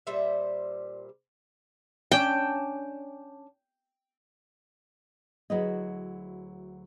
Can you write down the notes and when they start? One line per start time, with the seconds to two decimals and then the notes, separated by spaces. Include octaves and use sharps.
0.07 A#2 G3 C5 E5
2.12 C#4 D4 G5
5.50 D2 F#3 E4 G#4 B4 D#5